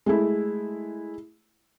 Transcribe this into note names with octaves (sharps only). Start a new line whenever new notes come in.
G#3 A3 E4